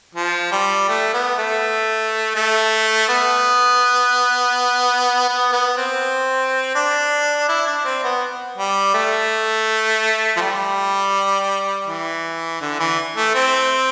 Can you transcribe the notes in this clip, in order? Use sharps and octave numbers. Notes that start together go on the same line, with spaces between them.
F3
G3
A3
B3
A3
A3
B3
B3
B3
C4
D4
E4
D4
C4
B3
G3
A3
F3
G3
E3
D3
E3
A3
C4